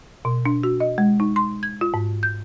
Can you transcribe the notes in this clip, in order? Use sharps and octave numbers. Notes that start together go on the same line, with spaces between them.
B2
D4
F#4
D#5
G#3
D#4
C6
G#6
F4
G#2
G6